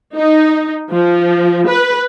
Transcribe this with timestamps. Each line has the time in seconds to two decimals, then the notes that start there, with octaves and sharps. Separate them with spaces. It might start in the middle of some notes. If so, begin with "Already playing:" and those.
0.15 D#4
0.92 F3
1.69 B4